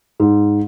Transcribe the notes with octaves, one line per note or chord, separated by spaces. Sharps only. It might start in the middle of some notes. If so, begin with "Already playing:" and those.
G#2